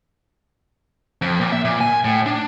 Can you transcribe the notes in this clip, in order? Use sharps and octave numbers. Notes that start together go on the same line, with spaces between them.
F2
A#2
E5
A#2
G#5
A2
D4